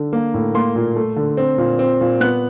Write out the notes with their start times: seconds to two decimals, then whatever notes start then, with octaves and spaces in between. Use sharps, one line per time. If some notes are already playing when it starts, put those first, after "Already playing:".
Already playing: D3
0.13 A#3
0.34 A2
0.55 A#3 C6
0.76 A#2
0.96 A3
1.16 D3
1.37 C4
1.58 A#2
1.79 C4
2.01 A#2
2.20 B3 F#6